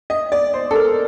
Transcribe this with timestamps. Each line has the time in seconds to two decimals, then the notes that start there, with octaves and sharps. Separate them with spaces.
0.10 D#5
0.32 D5
0.54 C5
0.71 A4
0.75 A#4